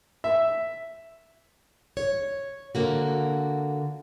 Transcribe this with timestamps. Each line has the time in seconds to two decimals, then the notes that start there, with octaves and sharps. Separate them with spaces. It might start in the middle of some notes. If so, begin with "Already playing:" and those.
0.24 E5
1.97 C#5
2.75 D3 A#3 F#4